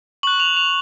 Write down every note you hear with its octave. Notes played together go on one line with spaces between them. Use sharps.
C#6 F#6 F#7
F7
F7